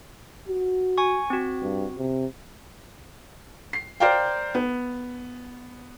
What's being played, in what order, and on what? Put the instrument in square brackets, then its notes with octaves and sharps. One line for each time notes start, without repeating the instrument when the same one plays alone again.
[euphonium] F#4
[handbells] G#5 C#6
C4 F#4
[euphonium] G2
C3
[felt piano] C7
A#4 C5 D5 F5 G5
B3